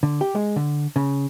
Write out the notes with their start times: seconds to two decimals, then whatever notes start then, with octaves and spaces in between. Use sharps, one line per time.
0.03 D3
0.21 G4
0.35 G#3
0.56 D3
0.96 C#3